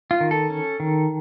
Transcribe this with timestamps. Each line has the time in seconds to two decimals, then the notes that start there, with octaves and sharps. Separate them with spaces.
0.11 F4
0.21 D#3
0.31 A4
0.50 C#4
0.80 D#3